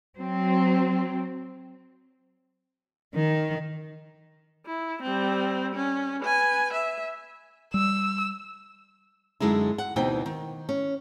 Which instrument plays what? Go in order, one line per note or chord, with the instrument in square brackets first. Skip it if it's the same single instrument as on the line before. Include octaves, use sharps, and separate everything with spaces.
[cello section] F#3 C4
D#3
[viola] E4
G3 C4
C#4
B4 G#5
E5
[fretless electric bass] G3 [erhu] E6
[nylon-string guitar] F#2 D3 G#3 D#4 E4
F#5
D2 B2 E3 C4 D#4 G5
D#3
C#4